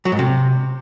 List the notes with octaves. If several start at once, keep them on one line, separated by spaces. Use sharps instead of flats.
F#3
G#2
C3